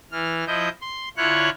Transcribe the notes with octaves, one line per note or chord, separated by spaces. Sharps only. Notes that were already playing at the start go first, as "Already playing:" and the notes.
E3 F6
F3 E4 D#5 G6
C6
D3 E4 F4 C#5 C#6 F#6